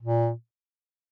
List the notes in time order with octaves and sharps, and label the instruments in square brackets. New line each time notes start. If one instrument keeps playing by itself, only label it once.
[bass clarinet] A#2